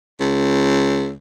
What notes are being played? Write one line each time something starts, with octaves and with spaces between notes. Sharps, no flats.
C#2